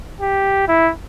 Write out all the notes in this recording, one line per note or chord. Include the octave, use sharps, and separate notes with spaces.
G4
E4